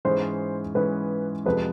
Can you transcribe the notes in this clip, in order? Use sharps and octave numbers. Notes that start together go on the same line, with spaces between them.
G#2 E3 G#3 C#4 C5
G#2 E3 G#3 C#4 B4
F2 C3 F3 G#3 B4